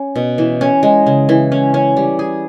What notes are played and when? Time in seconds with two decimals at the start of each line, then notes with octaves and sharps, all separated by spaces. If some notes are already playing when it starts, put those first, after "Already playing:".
Already playing: C#4
0.16 B2
0.38 E3
0.61 C#4
0.83 G#3
1.06 C#3
1.29 E3
1.52 C#4
1.74 C#4
1.97 G3
2.19 G#4